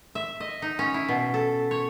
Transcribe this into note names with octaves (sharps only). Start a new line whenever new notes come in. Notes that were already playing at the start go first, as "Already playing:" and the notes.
E5
D#5
D#4
C#4
E4
B2
A4
C#5